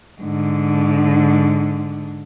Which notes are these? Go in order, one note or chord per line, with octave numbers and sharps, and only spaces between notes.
G#2 D3